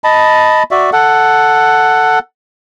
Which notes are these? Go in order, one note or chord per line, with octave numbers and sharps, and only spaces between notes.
D#5 A5 B5
F#4 D5 E5
A4 F#5